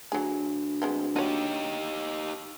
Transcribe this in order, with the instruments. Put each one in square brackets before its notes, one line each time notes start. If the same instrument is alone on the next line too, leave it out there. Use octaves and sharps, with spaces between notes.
[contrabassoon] D2 [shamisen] F#3 G#4
[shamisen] G#3 B3 C4
[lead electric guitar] D#4 G4 [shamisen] F#4 C#5